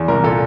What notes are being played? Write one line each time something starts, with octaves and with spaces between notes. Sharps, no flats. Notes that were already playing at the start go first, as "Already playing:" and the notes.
Already playing: E2
C2 A#4
A#2 A4